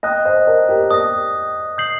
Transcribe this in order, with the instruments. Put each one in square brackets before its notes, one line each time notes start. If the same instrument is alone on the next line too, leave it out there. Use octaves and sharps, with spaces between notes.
[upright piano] D#5 G5 [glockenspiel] D#6 F#6 A#6
[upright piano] C5 D#5
A#4 D5
G4 A#4
[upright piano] A#4 D5 [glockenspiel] D#6 F#6 A#6
[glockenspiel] D#6 G6 C7 F#7